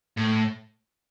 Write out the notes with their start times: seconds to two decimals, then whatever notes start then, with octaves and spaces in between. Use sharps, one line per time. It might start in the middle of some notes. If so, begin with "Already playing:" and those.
0.17 A2